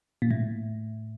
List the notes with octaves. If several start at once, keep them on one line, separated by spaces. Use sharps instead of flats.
A#2
A2